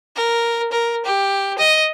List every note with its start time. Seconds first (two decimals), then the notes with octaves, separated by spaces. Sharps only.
0.16 A#4
0.72 A#4
1.05 G4
1.58 D#5